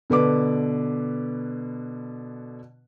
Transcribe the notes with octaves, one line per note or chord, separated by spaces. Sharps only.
B2 D3 B4 D6